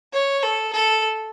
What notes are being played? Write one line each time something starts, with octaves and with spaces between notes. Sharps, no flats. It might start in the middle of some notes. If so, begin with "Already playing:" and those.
C#5
A4
A4